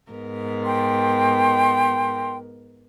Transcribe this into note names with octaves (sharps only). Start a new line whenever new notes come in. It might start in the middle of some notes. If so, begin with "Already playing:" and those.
G#2 B3 A#4
G5 C6